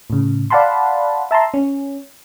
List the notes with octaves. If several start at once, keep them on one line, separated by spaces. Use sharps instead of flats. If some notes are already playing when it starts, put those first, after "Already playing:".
A2 C#3
D5 F5 F#5 A5 B5 C6
E5 A5 A#5 C6
C#4